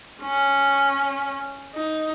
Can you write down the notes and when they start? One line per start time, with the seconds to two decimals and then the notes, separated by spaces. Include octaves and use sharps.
0.23 C#4
1.75 D#4